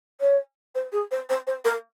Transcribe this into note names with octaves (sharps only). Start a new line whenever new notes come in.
C#5
C5
G#4
C5
C5
C5
A#4